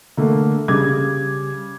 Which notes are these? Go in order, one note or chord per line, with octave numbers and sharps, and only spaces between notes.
D3 A3 A#3
C#3 G3 D6 G#6